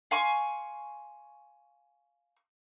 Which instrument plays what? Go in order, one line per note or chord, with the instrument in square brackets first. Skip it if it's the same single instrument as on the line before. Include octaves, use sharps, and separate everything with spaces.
[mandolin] F5 G#5 C6 C#6